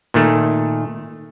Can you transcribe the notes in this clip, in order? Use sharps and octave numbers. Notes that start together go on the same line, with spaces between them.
A#2 D#3 A3